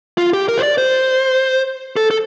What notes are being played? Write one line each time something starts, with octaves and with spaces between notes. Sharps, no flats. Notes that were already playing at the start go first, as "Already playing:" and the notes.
F4
G4
A#4
C5
D5
C5
A4
A4